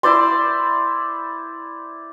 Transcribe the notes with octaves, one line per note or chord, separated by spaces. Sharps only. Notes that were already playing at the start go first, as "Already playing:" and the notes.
E4 C5 D5 C6